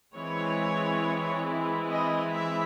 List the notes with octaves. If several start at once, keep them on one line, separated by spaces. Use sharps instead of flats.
E3 G#3 C4 E4 C#5
D#5
E5